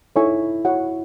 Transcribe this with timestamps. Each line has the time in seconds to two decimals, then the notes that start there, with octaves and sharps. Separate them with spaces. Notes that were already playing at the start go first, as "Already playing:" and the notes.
0.16 D#4 E4 A4 C#5 G#5 C#6
0.65 F#4 C#5 F#5